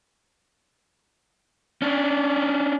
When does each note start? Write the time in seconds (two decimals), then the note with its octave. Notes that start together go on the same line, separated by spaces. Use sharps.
1.82 C#4 D4